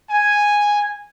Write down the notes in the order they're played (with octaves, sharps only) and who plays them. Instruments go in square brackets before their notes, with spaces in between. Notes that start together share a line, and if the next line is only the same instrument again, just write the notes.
[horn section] G#5